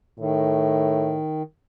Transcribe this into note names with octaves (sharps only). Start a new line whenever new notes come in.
A2 D#3